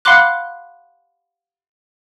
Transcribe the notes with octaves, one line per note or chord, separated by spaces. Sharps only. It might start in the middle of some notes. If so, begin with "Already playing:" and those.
F5 F#5 B5 C6 D6 F#6